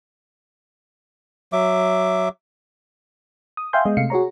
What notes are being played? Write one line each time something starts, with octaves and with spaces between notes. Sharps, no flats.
F#3 E5 D6
D#6
E5 F5 G5 G#5 C6 G6
G#3 B3 D#5
C3 A3 F5 C7 C#7
F#4 G#4 C#5 A#5